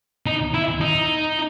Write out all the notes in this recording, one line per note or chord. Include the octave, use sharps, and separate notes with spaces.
D#4
E4
D#4